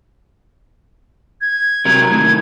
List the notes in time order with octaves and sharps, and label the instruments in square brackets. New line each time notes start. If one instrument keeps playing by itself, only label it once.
[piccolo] G#6
[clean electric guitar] C3 F#3 A#4
A2 D#3